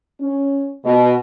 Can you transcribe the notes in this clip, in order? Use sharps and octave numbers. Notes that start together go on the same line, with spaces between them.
C#4
B2